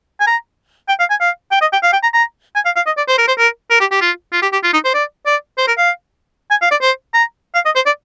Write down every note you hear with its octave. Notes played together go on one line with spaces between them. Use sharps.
G#5
A#5
G5
F5
G#5
F5
G5
D#5
G5
F5
G5
A#5
A#5
G#5
F5
F5
D#5
D5
C5
A#4
C5
A#4
A#4
G4
G4
F4
F4
G4
G4
F4
D#4
C5
D5
D5
C5
A#4
F5
G#5
F5
D5
C5
A#5
F5
D#5
C5
D5